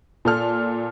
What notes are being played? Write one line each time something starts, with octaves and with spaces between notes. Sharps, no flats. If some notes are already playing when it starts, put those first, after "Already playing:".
A#2 A4 F6